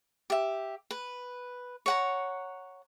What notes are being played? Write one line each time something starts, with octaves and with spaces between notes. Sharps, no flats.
G4 E5
B4
C#5 F#5 A#5